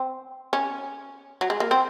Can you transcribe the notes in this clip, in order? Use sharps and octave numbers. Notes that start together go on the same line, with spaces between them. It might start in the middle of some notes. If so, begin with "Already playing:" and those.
Already playing: C4
C#4
F#3
G#3
A#3
C4